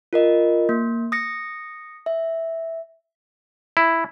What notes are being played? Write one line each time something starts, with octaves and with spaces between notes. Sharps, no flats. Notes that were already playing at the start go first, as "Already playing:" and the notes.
F4 A#4 D#5
A#3
D#6 A#6 C#7
E5
E4